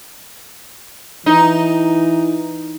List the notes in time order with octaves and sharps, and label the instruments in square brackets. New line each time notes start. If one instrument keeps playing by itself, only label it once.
[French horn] E3 [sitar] D#4